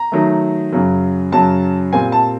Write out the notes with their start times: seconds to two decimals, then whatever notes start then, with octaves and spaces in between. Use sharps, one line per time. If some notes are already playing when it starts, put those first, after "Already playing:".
Already playing: A#5
0.12 D#3 F#3 A3
0.72 F#2 C#3 F#3
1.32 F#2 C#3 F#3 A5
1.93 A#2 G3 C4 G#5
2.12 A5